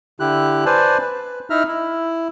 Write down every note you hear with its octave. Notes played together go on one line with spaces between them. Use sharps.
D3 E4 G4 F#6
B4 C5 D5 G#5 A5
B4
D#4 E4 E5 A#5 F6
E4